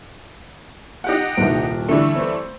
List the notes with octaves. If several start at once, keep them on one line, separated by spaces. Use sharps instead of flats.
D#4 G4 F#5
D#1 C2 D7
D3 E3 G3 A3
C4 C5